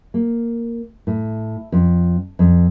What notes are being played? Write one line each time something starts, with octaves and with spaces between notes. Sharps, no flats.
A#3
A2
F2
F2